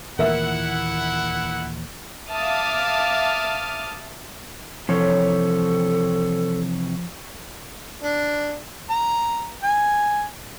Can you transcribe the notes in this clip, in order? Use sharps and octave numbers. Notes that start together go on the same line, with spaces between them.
D#2 A#2 E3 E4 A#4 E5 F#5 E6
E5 F5 A5 D6 D#6 F6
C3 E3 F3 A4 C#5
D4
A#5
G#5